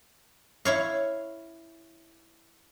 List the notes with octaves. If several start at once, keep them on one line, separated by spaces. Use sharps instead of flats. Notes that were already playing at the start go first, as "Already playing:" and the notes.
E4 C#5 F5